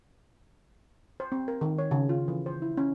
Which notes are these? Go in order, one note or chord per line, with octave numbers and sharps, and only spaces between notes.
C5
C4
A#4
D#3
C#5
C#3
F4
E3
C5
E4
C#4